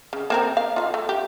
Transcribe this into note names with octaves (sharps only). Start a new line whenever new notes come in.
C#3
A#3 C4 A#4
F5
F4 E5 F5
A3
G4